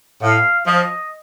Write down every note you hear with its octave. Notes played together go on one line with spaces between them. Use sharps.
A2 F5
F3 D#5